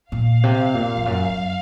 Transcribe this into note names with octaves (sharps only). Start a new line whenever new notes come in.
A#2 F5
C3
A#2
F2
F#2
F#2